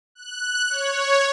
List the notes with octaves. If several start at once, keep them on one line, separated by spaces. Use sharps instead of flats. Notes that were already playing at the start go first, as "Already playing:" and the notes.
F#6
C#5